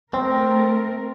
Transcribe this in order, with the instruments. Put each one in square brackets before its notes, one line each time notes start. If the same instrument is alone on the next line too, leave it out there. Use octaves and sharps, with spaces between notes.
[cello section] A3 A#4 [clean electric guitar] C4